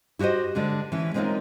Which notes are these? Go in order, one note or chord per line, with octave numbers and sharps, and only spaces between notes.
E4 F#4 G4 C5 D#5
D3 G#3 D4
E3 C#4
G#3 C4 C#4 D#4 F4 A#4